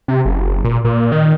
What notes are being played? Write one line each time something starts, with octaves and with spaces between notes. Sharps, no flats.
C3
F#1
A#2
A#2
D#3